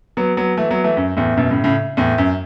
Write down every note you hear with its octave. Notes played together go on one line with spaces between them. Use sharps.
F#3 B3
F#3 B3
E3 A3
F#3 B3
E3 A3
F#2
E2 A2
F#2 B2
A2 C#3
A2 C#3
E2 A2
F#2